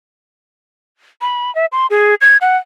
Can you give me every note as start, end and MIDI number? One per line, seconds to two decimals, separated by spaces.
1.21 1.53 83
1.55 1.66 76
1.72 1.87 84
1.90 2.15 68
2.21 2.37 92
2.41 2.57 78